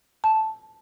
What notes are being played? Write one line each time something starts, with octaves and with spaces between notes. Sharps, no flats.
A5